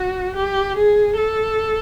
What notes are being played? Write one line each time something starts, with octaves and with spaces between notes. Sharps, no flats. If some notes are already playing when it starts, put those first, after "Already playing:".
Already playing: F#4
G4
G#4
A4